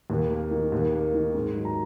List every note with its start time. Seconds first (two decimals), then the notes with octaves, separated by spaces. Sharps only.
0.10 D#2
0.30 A#3
0.51 D#3
0.72 D#2
0.93 A#3
1.14 D#3
1.34 G#2
1.55 F#3
1.65 A#5